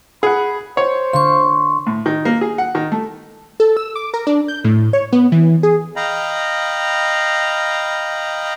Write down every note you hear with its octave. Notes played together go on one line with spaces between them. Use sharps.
G#4 F#5 B5
C5 C#5
D3 F5 C6 C#6
A2
D#3
A#3
G#4
F#5
D#3
A3
A4
E6
D6
A#4
D4
G6
A2
C#5
B3
E3
G#4
D#5 F5 G5 A#5 B5